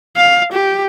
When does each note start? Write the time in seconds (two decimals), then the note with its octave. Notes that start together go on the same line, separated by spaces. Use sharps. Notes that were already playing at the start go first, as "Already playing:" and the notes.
0.17 F5
0.52 G4